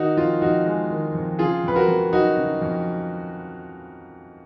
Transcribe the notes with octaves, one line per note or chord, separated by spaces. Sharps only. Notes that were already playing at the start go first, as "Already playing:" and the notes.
Already playing: D#3 D#4 F#4
F2 F4
F2 D#4 F#4
G#3
D#3
F2
C#3 F4 G#4
F2 B4
F#4 A#4
F2
F#3 D#4 F#4
C#3
F2